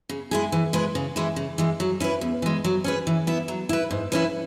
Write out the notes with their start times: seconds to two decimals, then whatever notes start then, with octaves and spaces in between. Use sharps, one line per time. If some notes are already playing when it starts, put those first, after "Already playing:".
0.09 C#3
0.31 G#3 E4 G#4
0.52 E3
0.73 G#3 E4 B4
0.95 C#3
1.16 E3 G#3 E4
1.36 C#3
1.58 E3 G#3
1.80 F#3
2.00 C#4 E4 B4
2.21 E2
2.42 E3 G#3
2.64 F#3
2.84 C#4 G#4 B4
3.07 E3
3.27 B3 E4
3.48 F#3
3.69 E4 B4
3.91 G#2
4.12 E3 C#4 E4 B4